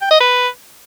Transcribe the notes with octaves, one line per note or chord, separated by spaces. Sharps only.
G5
D#5
B4